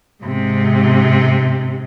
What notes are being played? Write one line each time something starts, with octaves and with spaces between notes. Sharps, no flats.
G#2 C3